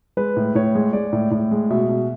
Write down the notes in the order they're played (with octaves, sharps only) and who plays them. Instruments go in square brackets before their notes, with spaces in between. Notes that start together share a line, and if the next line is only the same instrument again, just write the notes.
[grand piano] G#3 B4
A2
A2 C#5
G#3
G#3 D5
A2
A2
G#3
B2 E5
B2